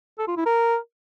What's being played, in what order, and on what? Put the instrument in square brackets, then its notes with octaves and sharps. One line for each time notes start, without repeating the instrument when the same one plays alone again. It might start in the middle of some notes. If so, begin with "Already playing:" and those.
[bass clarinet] A4
F4
E4
A#4